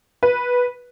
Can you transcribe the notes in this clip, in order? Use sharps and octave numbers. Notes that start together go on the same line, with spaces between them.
B4